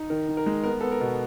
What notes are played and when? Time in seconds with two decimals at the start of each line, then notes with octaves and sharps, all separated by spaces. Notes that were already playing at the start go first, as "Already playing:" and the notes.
Already playing: D#4
0.10 D#3 A#4
0.28 D#3
0.37 A#4
0.46 G#3
0.63 B3 A#4
0.81 B3 A4
0.92 A#4
1.01 B2